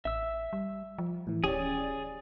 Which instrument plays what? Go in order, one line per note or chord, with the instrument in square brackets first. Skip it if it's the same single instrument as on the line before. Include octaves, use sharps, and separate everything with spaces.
[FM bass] A1 [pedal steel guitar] E5 E6
[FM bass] G3
F3
[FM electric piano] A2 E3
[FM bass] D1 [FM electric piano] C#4 G4 [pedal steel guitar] G#4 D5